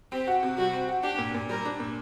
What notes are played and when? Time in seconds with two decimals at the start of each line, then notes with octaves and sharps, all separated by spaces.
0.12 C4 G4
0.27 F#4
0.43 C3
0.58 G3 F#4
0.73 C4
0.88 F#4
1.03 D4 G4
1.18 A#2
1.34 A#2
1.49 G3 A#4
1.65 D4
1.80 A#2